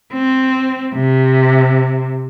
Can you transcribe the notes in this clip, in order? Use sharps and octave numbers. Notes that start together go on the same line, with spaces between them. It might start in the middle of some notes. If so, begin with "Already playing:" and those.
C4
C3